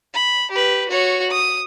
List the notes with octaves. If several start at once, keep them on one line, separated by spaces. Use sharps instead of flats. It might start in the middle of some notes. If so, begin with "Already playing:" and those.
B5
G4 B4
F#4 C#5
D#6